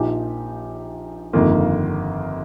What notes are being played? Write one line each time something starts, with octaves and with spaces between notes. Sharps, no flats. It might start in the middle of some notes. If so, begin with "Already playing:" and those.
Already playing: A#1 A#2 F3 D#4 G4
G1 F2 D#3 A#3 F4